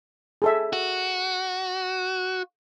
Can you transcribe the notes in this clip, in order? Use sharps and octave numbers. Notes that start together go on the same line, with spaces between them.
G#4 A4 E5
F#4